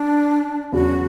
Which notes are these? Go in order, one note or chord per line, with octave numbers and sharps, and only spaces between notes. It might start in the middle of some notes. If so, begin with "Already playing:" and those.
Already playing: D4
E2 C#3 F#3 F#4